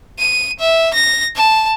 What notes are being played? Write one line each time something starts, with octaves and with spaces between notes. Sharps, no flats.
D#7
E5
A#6
A5